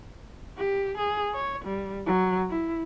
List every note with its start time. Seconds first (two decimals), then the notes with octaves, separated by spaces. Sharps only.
0.58 G4
0.98 G#4
1.34 C#5
1.65 G3
2.06 F#3
2.50 E4